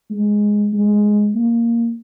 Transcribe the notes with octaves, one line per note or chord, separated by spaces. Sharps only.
G#3
G#3
A#3